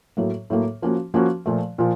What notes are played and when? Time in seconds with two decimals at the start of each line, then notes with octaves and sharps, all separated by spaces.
0.17 A2 F#3 A#3
0.50 A2 F#3 A#3
0.82 F3 A#3 C#4 F#4
1.14 F3 A#3 C#4 F#4
1.46 A#2 F3 A3
1.78 A#2 F3